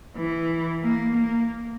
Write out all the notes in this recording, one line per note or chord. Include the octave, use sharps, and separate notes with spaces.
E3
A#3
A#3